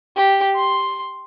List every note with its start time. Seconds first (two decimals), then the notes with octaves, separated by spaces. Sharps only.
0.16 G4
0.55 C6